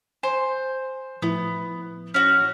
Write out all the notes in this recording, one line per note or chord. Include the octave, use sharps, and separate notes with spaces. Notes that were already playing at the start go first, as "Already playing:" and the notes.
C5 G#5
A2 F3 B3 E4
C#4 F#4